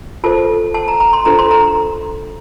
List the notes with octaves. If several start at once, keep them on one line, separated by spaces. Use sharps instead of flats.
F4 A4 C5 A5
A5
A#5
A#5
C6
D4 F4 A4 C5 A#5
C6
A#5